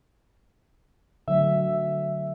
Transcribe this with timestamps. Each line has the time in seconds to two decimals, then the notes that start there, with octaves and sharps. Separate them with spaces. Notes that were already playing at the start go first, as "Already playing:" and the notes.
1.28 D3 F#3 A3 E5